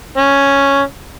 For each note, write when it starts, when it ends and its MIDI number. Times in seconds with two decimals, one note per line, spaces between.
0.18 0.80 61